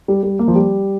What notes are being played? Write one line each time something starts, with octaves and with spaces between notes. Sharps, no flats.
G3
G3
A#3
F3
G3